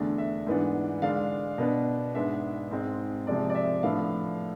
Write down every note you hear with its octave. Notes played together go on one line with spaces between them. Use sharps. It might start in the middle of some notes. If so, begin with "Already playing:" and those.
Already playing: E2 D3 A3 D4
E5
G#2 E3 B3 D4
D3 G#3 D4 F5
B2 B3 D4
G#2 G#3 B3 D4 E5
G#2 G#3 C4
C3 F3 G#3 C4 D5
D5
E5
A2 F3 B3 D4 F5